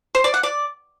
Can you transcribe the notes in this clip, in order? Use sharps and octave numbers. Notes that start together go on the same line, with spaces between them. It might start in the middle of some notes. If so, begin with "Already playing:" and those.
C5
D5
F#5
D5